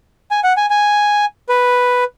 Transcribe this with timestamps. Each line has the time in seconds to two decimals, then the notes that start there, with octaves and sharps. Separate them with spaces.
0.31 G#5
0.44 F#5
0.57 G#5
0.70 G#5
1.49 B4